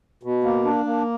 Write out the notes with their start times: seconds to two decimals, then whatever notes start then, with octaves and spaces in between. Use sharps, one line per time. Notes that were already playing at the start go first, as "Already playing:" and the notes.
0.23 B2
0.44 A#3
0.65 D4
0.85 A#3